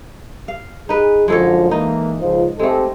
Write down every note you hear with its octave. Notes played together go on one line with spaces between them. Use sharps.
F5
D#4 G#4 B4
F#2 D3 F3 G#3 A4 C#5
E3 A#3 D#4
C#2 F3
G#3 A3 C4 G4 A4